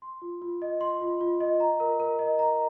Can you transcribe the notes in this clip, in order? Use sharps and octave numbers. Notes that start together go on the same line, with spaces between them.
C6
F4
F4
D#5
C6
F4
F4
D#5
A#5
A#4
A#4
D#5
A#5